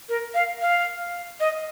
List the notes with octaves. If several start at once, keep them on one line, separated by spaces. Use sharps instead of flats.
A#4
F5
F5
D#5